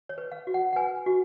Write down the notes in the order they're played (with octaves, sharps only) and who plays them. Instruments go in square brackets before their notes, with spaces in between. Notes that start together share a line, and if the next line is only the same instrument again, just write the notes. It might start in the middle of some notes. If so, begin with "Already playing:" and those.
[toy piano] C#5
B4
F5
F#4
F#5
F#5
B4 G#5
F#4